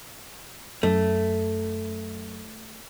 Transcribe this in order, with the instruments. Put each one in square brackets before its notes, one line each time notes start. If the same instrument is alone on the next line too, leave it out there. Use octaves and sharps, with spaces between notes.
[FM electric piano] F#2 [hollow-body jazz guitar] A3